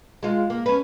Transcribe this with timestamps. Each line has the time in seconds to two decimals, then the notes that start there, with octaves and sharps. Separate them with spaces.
0.23 G#3 F4
0.50 A#3
0.66 C#4 B4